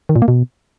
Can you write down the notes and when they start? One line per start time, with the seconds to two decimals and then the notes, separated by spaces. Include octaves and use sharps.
0.09 D#3
0.16 A#2
0.22 A#3
0.28 B2